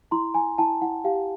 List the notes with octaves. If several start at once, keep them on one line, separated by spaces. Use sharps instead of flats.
E4 A#5 C6
E4 G#5 A#5
E4 G5 A5
E4 F#5
G4 F5 G5